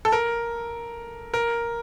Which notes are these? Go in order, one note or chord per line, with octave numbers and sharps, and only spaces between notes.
A4
A#4
A#4